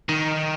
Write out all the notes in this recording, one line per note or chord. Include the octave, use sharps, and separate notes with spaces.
D#3